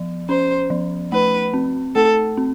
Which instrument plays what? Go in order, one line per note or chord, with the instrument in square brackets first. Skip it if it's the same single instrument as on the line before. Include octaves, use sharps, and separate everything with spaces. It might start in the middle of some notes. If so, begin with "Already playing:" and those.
Already playing: [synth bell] F3
[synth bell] C#4 [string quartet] C5
[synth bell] F3
[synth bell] A3 [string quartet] B4
[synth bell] C4
[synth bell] A3 [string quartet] A4
[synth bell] C4